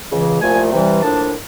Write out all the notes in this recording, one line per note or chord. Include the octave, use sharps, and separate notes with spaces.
C#2 C#3 E3
C2 A#2 F3 A3 G#5
C3 E3 G3
A2 F3 A#3 D4 A5